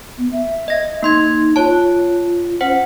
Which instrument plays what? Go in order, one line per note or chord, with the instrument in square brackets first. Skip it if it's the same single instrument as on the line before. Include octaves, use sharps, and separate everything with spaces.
[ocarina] B3
E5
[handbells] D#5 A#6
[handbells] A#3 C6 G#6 [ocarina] D#4
[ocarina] F4 [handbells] C#5 A5
[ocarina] C#4 [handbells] C5 F#5